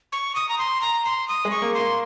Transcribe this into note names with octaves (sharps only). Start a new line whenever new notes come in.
C#6
D#6
A#5
C6
A#5
C6
D#6
G#3
C#6
A#3
C6
A#3